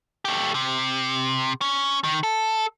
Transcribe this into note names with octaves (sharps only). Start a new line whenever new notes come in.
A3 G4
C3
C#4
D#3
A4